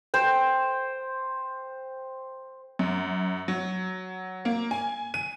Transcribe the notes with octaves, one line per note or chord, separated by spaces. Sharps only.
C5 G5
F#2
F#3
A#3
G#5
D#7